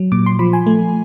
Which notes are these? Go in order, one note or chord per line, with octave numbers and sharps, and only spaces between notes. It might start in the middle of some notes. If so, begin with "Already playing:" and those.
Already playing: F#3
A#2 D6
C6
F3 B5
G#5
A3